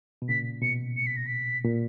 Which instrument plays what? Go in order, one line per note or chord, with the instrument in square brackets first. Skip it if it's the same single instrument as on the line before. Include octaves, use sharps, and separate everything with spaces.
[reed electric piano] B2
[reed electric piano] A#2 C#3 [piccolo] B6
[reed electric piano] B2 [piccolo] C#7
[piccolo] C#7
B6
A#6
B6
[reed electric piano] A#2